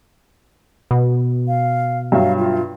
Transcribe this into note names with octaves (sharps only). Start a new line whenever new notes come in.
B2
F5
G2 F#3 E5 F5
F4